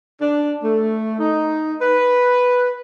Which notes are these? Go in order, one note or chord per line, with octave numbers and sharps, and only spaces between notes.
D4
A3
D#4
B4